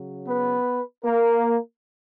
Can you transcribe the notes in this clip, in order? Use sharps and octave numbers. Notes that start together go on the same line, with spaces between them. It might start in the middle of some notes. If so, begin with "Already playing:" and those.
Already playing: C#3 F#3
B3 B4
A#3 A#4